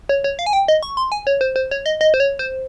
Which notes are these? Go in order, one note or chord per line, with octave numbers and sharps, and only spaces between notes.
C#5
C#5
F5
G#5
G5
D#5
C#6
C6
G#5
C#5
C5
C5
C#5
D#5
D#5
C5
C#5
C5